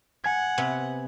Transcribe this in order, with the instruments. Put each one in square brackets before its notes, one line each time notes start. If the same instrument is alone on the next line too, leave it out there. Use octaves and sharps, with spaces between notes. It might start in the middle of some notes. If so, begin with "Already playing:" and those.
[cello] F#5 [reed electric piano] G#5 G#6
[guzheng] C3 B3